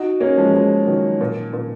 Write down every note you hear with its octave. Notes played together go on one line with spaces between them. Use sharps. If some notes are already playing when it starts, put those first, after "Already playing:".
Already playing: D#4 F#4
A#3 C#4
F3 G#3
F3 G#3
D#3 F#3
A#2
A#2